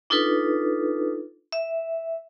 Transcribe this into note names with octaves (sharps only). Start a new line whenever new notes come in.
D4 D#4 F4 A4 B4
E5